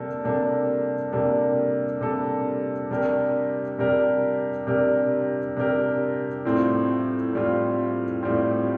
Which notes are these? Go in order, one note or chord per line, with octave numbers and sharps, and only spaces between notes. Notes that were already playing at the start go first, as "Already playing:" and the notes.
Already playing: C3 G3 A#3 D4 A4
C3 G3 A#3 D4 A4
C3 G3 A#3 D4 A4
C3 G3 A#3 D4 A4
C3 G3 D4 G4 A#4
C3 G3 D4 G4 A#4
C3 G3 D4 G4 A#4
C3 G3 D4 G4 A#4
A2 G3 C4 F4
A2 G3 C4 F4
A2 G3 C4 F4